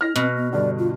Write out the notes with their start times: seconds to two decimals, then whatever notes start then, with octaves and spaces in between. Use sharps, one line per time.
0.01 E4 F6 A#6
0.16 B2 C4
0.36 B3
0.53 G2 D3 D5
0.78 F4